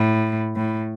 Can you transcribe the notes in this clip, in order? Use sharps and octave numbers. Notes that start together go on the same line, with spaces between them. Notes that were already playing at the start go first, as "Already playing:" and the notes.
Already playing: A2
A2